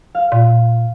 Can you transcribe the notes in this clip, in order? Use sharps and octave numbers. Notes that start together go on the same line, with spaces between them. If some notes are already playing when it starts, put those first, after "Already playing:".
F5
A#2